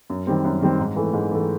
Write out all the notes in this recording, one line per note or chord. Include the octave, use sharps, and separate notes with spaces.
F#2
D#3 G3 C4
F#2
D#3 G3 C4
G#2
E3 A3
G#2
E3 A3